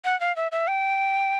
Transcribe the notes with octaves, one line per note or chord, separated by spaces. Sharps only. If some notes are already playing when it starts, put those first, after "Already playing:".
F#5
F5
E5
E5
G5